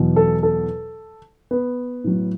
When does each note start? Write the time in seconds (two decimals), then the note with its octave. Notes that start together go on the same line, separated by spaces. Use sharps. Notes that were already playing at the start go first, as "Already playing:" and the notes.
Already playing: E2 B2 F#3
0.16 A4
0.43 A4
1.51 B3
2.04 A2 F#3